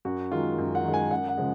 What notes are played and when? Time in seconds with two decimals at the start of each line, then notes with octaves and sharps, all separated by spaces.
0.05 F#2 F#4
0.32 D#3 G#3 F4
0.58 F#2
0.75 F#5
0.84 D#3 G#3
0.94 G#5
1.11 F#2 F#5
1.28 F#5
1.37 C#3 F3 G#3